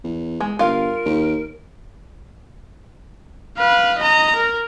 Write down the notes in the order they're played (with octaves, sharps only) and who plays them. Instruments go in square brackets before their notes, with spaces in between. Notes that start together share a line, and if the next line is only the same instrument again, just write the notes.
[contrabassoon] E2
[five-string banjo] G#3
[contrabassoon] G1 [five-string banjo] F4 F5 [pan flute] A#4
[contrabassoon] D#2
[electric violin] B4 F5
D#5 A#5
A#4